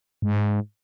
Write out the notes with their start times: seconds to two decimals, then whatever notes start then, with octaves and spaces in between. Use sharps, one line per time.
0.22 G#2